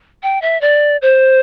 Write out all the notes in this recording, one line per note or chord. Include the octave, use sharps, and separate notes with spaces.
G5
E5
D5
C5